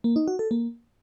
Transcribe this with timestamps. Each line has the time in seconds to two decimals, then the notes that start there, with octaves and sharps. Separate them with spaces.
0.04 A#3
0.16 D#4
0.28 F#4
0.39 A4
0.51 A#3